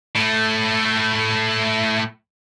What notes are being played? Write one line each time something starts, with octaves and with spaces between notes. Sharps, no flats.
A2 A3